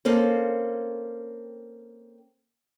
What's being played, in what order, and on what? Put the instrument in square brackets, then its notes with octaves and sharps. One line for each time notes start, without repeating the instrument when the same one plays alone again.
[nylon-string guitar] A#3 C4 C#4 A4